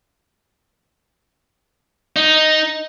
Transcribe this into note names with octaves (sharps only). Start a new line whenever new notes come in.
D#4